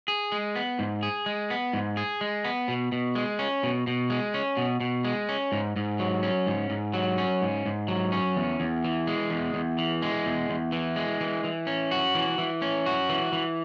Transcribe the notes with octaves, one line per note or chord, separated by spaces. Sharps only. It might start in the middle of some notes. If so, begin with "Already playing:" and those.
G#4
G#3
B3
G#2
G#4
G#3
B3
G#2
G#4
G#3
B3
B2
B2
G#3
C#4
B2
B2
G#3
C#4
B2
B2
G#3
C#4
G#2
G#2
F#3
C#4
G#2
G#2
F#3
C#4
G#2
G#2
F#3
C#4
E2
E2
E3
G#3
E2
E2
E3
G#3
E2
E2
E3
G#3
E3
E3
C#4
F#4
E3
E3
C#4
F#4
E3
E3